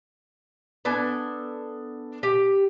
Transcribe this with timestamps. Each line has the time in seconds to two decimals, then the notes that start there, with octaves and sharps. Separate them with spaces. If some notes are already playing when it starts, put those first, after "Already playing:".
0.85 B3 D4 A4 G#5
2.23 G4